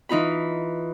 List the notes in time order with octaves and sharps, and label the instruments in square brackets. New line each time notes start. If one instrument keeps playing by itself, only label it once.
[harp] E3 D#4 F4 B5